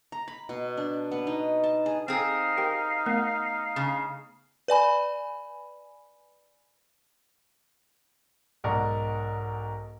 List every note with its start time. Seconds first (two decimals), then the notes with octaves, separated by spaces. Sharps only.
0.12 A#5
0.28 B5
0.49 B2
0.77 D4
1.11 B3
1.27 D#4
1.64 A5
1.86 G#4
2.08 C4 D#4 G#4 F5
2.57 G4 A#4 G5
3.06 A3 B3 A#4
3.76 C#3
4.68 B4 D5 G#5 B5
8.64 B1 G#2 A#4 D5 F#5 C#6